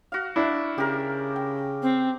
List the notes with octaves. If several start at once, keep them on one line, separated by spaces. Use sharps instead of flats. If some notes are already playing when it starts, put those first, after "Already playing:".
F#4 F5
D4 E4
C#3 G4 A#4
G5
C4